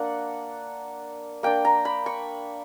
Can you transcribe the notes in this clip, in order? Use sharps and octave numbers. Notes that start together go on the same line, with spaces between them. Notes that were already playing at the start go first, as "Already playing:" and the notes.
Already playing: A#3 D4 F#5
A#3 D4 G5
A#5
B5
C#6